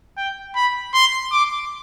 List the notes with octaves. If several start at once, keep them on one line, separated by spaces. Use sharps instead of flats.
G5
B5
C6
D6